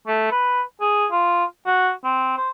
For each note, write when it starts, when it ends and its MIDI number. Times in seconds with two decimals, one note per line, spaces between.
0.07 0.27 57
0.31 0.62 71
0.81 1.06 68
1.11 1.44 65
1.66 1.91 66
2.04 2.37 60
2.37 2.50 72